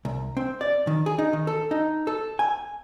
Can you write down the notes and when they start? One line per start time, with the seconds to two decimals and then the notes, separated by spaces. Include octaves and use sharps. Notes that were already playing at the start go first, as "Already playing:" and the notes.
0.05 C2
0.37 C4
0.61 D5
0.87 D#3
1.06 G#4
1.18 D#4
1.33 D#3
1.47 A4
1.71 D#4
2.07 A4
2.39 G#5